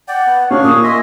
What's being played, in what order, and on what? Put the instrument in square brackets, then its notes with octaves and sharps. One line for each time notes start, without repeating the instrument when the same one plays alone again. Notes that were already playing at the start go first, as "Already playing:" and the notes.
[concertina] D5 G5 [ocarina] F#5
[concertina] B3
[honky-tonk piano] C#4 [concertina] D4 G#4 F5 [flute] C#6
[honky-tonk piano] A#2 [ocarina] D#6
[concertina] D#5 E5 G#5 [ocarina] C6